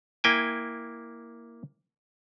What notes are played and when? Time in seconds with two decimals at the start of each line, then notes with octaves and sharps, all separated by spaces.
0.24 A#3 E4 G5 G#5